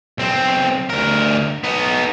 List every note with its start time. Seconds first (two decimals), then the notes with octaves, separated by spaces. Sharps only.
0.18 B1 C4
0.90 D2 A#4
1.64 B3 D#4